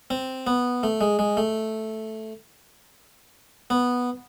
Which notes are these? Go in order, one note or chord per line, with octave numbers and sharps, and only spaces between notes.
C4
B3
A3
G#3
G#3
A3
B3